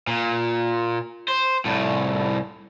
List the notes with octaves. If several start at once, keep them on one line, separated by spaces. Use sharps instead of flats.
A#2
C5
C2 A2